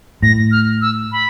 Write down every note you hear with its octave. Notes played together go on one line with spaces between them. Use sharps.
A2 A#6
F6
E6
B5